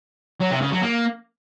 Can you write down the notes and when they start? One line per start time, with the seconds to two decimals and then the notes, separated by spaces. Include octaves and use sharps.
0.40 F#3
0.51 C3
0.61 C#3
0.72 F#3
0.82 A#3